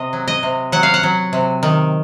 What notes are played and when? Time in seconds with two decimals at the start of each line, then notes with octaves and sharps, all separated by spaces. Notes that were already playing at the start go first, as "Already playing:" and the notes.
Already playing: C3 D#5
0.13 F#3
0.28 D#5
0.43 C3
0.72 F#3 F#5
0.83 F5
0.94 F#5
1.03 F#3
1.33 C3
1.63 D#3